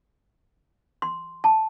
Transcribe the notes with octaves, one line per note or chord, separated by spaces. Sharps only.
C6
A5